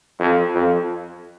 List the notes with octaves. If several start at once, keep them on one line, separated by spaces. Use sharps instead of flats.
F2
F2